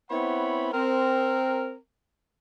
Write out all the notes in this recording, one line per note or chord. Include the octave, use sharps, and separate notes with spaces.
B3 C4 E4 C#5 F#5 B5
C4 A#4